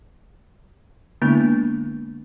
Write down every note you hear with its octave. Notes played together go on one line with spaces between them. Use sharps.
D3 G#3 A#3 B3 D4 E4